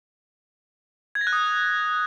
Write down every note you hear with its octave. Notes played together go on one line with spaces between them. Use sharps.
G#6
A#6
F#6
D#6